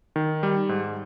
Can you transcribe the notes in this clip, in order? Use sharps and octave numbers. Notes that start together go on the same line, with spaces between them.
D#3
G3
G#2